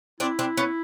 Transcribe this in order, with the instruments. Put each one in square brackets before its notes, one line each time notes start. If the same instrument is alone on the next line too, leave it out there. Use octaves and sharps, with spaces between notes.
[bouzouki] C4 D4 [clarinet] E4
[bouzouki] C4 D4
B3 C#4